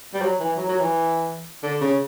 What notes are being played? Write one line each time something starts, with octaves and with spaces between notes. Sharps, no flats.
G3
F#3
E3
F#3
F#3
E3
D3
C#3